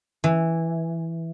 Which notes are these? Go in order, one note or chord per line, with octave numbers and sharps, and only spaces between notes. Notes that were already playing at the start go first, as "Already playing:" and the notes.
E3